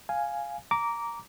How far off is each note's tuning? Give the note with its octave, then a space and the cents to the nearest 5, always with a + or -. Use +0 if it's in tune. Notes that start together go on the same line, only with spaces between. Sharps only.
F5 +0 G#5 +0
A#5 +0 D6 -15